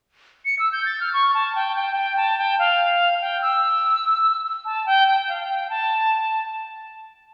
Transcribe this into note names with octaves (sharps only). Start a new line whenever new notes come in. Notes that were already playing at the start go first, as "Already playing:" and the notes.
C#7
E6
G6
A6
F6
C#6
A5
G5
G5
G5
A5
G5
F5
G5
E6
A5
G5
G5
F5
G5
A5